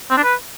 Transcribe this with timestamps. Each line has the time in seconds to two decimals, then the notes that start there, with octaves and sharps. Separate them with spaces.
0.11 C4
0.17 D4
0.24 B4